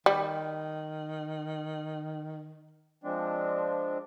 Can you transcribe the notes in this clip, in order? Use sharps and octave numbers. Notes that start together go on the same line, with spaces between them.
D#3 G3
F3 G#3 C4 D4